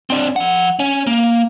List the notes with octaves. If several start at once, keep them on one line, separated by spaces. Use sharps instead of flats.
C4 D4
F3 F#5
C#4
A#3